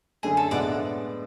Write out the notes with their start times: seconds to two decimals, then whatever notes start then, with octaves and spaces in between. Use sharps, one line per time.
0.23 F#2 D3 A3 G#4
0.37 A4
0.51 A2 G#3 B3 D4 D5 F#5